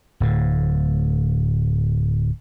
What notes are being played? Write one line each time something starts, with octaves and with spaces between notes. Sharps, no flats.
D1 A2